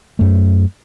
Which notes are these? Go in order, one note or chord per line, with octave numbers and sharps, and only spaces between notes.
F#2 A3